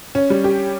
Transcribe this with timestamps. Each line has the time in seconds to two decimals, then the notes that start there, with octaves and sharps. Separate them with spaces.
0.15 C#4
0.30 G3
0.44 G4